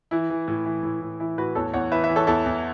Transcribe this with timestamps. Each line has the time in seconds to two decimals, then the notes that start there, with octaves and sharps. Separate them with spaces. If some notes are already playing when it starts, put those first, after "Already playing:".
0.11 E3 E4
0.30 E3
0.48 A2
0.66 E3
0.83 A2
1.01 A2
1.20 E3 E4
1.37 A2 F#4 B4
1.55 E2 A4 C#5
1.74 E2 C#5 F#5
1.92 E3 B4 E5
2.04 B4 E5
2.09 E3
2.16 A4 C#5
2.27 E2 E4 A4
2.45 E2